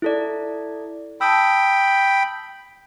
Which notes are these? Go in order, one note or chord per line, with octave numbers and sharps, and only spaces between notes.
E4 A4 D5
G5 A5 B5 D#6 E6